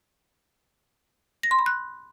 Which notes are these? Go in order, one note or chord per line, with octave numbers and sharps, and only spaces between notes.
A#6
C6
B5
F#6